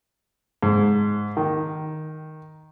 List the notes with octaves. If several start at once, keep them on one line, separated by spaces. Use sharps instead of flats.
G#2
D#3